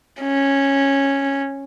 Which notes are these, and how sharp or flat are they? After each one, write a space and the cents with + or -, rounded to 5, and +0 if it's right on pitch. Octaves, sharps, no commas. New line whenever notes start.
C#4 -10